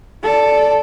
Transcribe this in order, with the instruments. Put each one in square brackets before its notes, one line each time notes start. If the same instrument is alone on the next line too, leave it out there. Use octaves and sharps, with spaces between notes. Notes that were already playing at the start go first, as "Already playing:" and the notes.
[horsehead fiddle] A4 D5